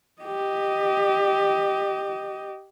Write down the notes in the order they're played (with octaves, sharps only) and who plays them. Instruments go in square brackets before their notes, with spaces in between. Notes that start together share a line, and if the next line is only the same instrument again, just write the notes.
[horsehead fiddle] G4 D#5